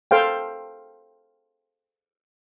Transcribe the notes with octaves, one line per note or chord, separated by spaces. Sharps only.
A4 C5 F5 G5